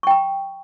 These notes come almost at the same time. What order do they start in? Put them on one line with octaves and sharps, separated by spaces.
C#6 G5 A#5